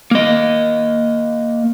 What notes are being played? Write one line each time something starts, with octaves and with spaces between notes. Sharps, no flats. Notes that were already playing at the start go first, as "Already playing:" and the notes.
A#3 D#5